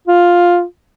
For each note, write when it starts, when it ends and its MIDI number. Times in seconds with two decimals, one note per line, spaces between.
0.08 0.64 65